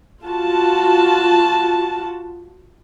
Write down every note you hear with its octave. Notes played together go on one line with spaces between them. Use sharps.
F4 F#4 A5